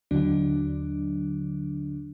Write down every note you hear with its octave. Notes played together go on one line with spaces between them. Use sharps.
D#2 D3 F#3 D4